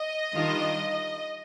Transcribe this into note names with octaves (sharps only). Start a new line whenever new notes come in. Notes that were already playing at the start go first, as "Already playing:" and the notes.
Already playing: D#5
D#3 G3 D4 F4